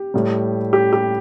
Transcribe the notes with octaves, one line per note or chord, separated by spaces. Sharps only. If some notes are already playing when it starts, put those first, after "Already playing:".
Already playing: G4
A2 G3
G4
G4